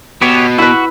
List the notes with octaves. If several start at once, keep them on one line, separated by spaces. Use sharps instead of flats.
B2 B3 G4 C#5
E4 F#4 B4